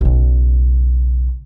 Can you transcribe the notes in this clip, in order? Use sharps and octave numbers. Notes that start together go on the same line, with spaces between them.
B1 C#3